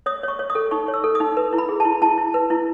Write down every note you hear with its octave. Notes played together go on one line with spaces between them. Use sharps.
C#5 D#6
C#5 C#6
C#5
D#6
A4
D#4 C#6
C#5
E6
A4
D#6
D#4
B4
E4
B5
G#4
A5
E4
E4 A5
E4
B4
E4